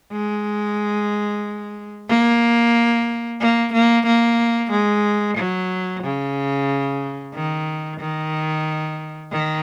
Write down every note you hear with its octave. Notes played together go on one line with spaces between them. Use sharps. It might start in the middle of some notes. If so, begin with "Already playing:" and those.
G#3
A#3
A#3
A#3
A#3
G#3
F#3
C#3
D#3
D#3
D#3